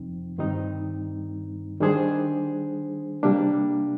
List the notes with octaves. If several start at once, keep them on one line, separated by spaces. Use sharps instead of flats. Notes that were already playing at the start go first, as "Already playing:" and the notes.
Already playing: F2 C3 F3 C4 D#4
G2 D#3 G3 C4 D#4
D#3 G3 D4 G#4 C5
C3 G3 A#3 D4